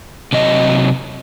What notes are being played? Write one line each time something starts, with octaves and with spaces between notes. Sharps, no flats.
C3 F#3 D#5